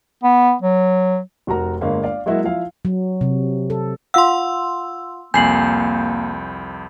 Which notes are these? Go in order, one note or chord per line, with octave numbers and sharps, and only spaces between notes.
B3
F#3
F1 F#4 A#4 A#5
G1 G#3 A#3 F5
D5 F5
F#3 G#3 A#3 E4 F#4
F3 E4 F5
F#3
C3
A4
F4 F5 F#5 C6 E6
C2 F2 A#3 G#5 G6 C7 F#7